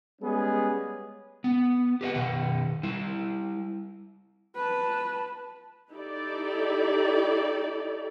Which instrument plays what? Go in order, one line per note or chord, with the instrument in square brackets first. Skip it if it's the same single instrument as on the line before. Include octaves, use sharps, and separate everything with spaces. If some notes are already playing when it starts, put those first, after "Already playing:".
[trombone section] G3 G#3 B3 C#4 G#4
[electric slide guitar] B3
G4 B4 D#5 F#5
B2 D#3 F#5
G3 E4
[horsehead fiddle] B4 A5
[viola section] D#4 E4 G4 A4 D5